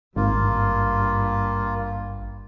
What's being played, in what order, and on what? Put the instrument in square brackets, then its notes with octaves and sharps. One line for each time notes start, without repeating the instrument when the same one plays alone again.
[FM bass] G#1 [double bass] G2 [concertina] A#3 F4